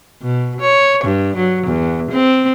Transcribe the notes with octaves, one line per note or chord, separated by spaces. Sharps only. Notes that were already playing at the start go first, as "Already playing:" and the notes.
B2
C#5
G2
F#3
E2
C4